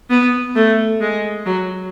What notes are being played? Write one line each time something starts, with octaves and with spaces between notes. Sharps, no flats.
B3
A3
G#3
F#3